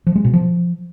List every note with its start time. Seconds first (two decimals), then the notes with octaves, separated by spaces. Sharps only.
0.07 F3
0.16 G#3
0.24 B2
0.33 F3